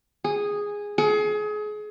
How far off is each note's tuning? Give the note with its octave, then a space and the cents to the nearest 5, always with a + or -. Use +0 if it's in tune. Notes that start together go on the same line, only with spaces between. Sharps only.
G#4 -10
G#4 +30